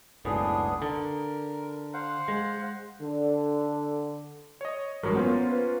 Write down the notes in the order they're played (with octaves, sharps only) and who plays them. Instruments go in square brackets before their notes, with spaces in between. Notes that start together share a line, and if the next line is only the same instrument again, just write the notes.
[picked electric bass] F#1 C#2 A2 [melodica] B3 D4 G#4
[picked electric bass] D3 [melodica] A#4
[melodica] C5 F5 F#5
[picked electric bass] G#3
[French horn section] D3
[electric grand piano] C#5 D#5
[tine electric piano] A1 A#4 [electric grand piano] G2 F#3 G#3
[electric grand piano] A#3 C#4 F4 [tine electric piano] B3 C5
[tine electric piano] B4